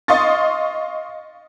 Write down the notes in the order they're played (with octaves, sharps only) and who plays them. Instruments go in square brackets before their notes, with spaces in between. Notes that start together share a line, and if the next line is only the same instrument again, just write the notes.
[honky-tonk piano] D#5 F5 C6 C#6 A6